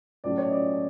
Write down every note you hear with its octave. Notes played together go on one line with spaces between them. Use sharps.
B1 A2 F#3 A3 C#4 D5
C#5
D#5
D5